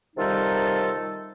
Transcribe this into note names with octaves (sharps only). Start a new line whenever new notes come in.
C3 D#3 G3 D#4 F4 A4